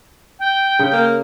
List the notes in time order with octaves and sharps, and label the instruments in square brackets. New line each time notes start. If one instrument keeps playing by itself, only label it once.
[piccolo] G5
[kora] C#3
[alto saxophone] A#3